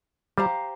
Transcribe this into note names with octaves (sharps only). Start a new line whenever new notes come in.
G3 G4 C5 F5 A#5